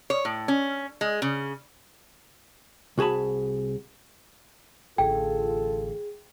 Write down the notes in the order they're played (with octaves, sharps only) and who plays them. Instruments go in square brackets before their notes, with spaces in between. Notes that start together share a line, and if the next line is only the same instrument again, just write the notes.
[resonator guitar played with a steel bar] C#5
A2
C#4
G#3
C#3
[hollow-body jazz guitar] C2 F#4 G#4 A5 B5
[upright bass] A1 D3 [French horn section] F4 A4 [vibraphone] G#4 [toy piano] G5